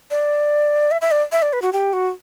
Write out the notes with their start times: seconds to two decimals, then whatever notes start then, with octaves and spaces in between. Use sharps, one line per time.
0.11 D5
0.91 E5
1.01 E5
1.11 D5
1.32 E5
1.42 D5
1.53 B4
1.62 F#4
1.73 G4
1.93 F#4